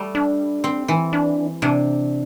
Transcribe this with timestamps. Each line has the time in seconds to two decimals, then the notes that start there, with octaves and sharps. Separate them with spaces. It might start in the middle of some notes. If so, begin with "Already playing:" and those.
Already playing: G3 A3
0.15 D4
0.64 C4
0.88 E3
1.13 D4
1.62 C3 D4